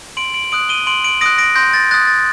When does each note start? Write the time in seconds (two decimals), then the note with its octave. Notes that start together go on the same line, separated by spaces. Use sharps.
0.17 C6 D7 F#7
0.34 D7 F#7
0.52 D#6 F#6 D7 F#7
0.69 D#7 G7
0.87 C6 D7 F#7
1.04 D7 F#7
1.21 D#6 F#6 A#6 D7
1.38 A#6 D7
1.55 C6 G6 A#6
1.74 A6
1.91 D#6 F#6 A6
2.07 A6